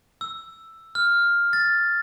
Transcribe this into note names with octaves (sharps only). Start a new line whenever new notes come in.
E6
F6
A6